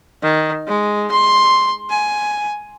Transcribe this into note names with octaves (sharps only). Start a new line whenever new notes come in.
D#3
G#3
C6
G#5